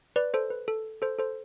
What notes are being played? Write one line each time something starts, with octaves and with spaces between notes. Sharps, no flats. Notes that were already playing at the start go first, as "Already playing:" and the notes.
B4 D5
A4 C5
B4
A4
A4 C5
A4 C5